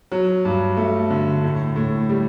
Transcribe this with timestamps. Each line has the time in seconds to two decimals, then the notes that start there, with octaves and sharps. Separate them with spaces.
0.12 F#3
0.45 G2
0.77 A3
1.10 D3
1.43 A2
1.76 A2
2.09 G3